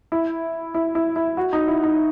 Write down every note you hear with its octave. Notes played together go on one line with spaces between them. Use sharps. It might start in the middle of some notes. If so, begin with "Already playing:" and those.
E4
E4
E4
E4
F#4
D#4
E4
D#4